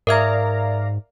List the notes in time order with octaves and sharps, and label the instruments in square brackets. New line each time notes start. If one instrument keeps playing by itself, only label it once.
[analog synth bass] G#2 [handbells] A#4 E5 G#6 [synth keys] D5 F5 A#5